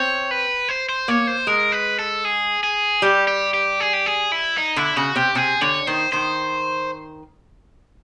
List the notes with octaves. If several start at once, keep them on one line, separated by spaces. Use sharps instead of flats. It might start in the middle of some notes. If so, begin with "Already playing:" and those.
Already playing: C4 C#5
B4
C5
C5
A#3 C#5
C5
G#3 A#4
B4
A4
G#4
G#4
G3 G4
G4
G4
G#4
G4
G#4
E4
D#4
D3 E4
C#3 F#4
C3 G4
C3 G#4
D3 C#5
D#3 C5
D#3 C5